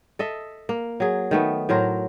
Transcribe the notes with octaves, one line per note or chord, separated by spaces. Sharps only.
A4 D#5 E5
A#3
F#3 G#4
D#3 A3 B3
A2 F#3 A#4 C5